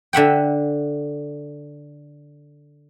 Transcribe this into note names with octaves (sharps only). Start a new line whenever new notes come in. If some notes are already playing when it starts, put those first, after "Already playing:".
D3 E5 F#5 G5